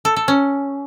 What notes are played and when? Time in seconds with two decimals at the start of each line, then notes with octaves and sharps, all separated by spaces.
0.05 A4
0.16 A4
0.28 C#4